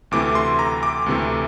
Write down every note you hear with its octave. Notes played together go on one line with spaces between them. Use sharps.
D2 C3 E3 A3 D6
C6
A#5
D6
D2 C3 E3 A3